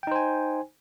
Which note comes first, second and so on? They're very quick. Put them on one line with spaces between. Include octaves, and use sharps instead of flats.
G5 D#4 C5 G#5